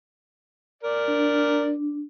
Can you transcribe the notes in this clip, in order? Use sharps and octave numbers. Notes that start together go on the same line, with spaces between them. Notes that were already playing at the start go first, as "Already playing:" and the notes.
A#4 D5
D4